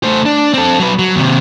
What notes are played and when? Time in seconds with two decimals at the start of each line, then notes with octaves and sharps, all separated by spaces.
0.03 A3 C5
0.26 D4
0.54 C4 A4
0.80 F#3 B4
0.99 F#3
1.15 D#2 C3